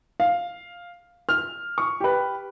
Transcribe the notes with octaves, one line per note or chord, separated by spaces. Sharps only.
F5
F6
C#6
G4 B4